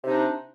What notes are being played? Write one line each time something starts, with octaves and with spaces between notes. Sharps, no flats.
C3 D4 D#4